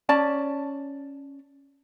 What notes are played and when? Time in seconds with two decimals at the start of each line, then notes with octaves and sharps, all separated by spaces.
0.09 C#4 D5 A5